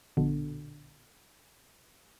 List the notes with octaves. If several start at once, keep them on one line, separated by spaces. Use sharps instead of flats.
A#1 B2 D3